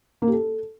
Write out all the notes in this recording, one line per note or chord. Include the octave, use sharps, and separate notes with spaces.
A#3
G4
A4